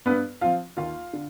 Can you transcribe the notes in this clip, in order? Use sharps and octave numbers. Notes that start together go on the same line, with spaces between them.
G2 B3 B4
F3 C4 F4 F5
D#2 F4 F5
D3